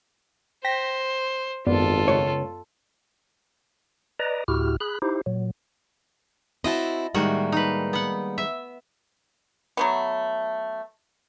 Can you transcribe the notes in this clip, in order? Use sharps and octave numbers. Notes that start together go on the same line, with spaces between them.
C5 G5 A#6 B6
G#1 F#2 B3 F4 A4 D5
C#2 C#5
B4 D5 D#5 A#5
D2 A2 E4 F#4 G4 F6
G#4 B5 F#6
D#4 E4 G4 C5
A#2 F#3
C4 E4 F#4 D#5 A5
A2 D#3 G3 G#3 A#3 F#4
D#4 B4
B3 F#5
E5
F#3 A3 B3